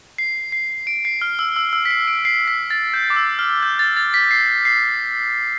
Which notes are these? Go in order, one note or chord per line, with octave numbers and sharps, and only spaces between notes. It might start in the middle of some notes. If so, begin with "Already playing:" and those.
C7
C7
D7
C7
F6
E6
E6
E6
B6
C7
D7
C7
B6
A6
G6
D6
E6
F6
G6
A6
A6
B6
C7
C7